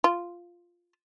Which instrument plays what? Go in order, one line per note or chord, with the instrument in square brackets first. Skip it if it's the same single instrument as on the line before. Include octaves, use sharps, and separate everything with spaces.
[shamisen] F4